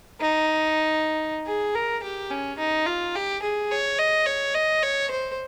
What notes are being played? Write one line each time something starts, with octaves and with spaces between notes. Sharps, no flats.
D#4
G#4
A#4
G4
C#4
D#4
F4
G4
G#4
C#5
D#5
C#5
D#5
C#5
C5